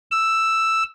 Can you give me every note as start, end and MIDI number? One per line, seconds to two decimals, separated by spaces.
0.11 0.83 88